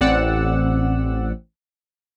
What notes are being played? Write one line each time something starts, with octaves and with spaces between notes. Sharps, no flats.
A1 C4 D5 F#5 E6